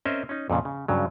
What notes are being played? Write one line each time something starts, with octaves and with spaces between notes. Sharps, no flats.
C4 C#4 A#4 C5 D#5 E5
C#4 D#4
F2 A#2 C#3
C#3
G2 C#3 F#3